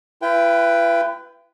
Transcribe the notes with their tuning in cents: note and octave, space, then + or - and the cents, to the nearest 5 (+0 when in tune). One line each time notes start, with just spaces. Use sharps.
E4 +45 B4 +0 G5 +0